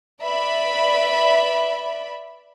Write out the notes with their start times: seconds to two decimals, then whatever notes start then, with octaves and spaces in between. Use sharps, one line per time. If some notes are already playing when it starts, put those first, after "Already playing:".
0.22 B4 D5 E5 B5